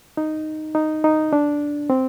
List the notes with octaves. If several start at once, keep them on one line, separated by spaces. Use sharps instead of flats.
D#4
D#4
D#4
D4
C4